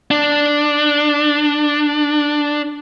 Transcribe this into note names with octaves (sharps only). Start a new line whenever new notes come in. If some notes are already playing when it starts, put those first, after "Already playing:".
D4